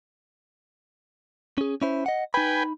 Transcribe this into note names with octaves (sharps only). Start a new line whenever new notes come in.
C#4 G#4
C#4 E4 C5
D#5 F#5
D#4 B4 G5 G#5 B5